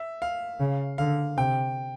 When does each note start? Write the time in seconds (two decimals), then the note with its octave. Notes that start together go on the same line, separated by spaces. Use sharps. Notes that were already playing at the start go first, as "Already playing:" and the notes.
Already playing: E5
0.22 F5
0.60 C#3
0.98 D3 F5
1.37 C3 G5